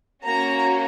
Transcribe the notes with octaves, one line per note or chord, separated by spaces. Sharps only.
A#3 C#4 F#4 A#5